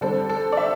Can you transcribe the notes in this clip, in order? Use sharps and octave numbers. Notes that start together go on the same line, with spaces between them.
D3 G3 C4 A4
A4
D5
E5